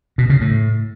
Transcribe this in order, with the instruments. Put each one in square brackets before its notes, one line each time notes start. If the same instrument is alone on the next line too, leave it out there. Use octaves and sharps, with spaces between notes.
[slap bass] B2
C#3
A2